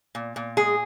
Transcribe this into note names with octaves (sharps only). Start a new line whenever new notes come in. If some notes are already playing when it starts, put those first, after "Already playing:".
A#2
A#2
G#3 G#4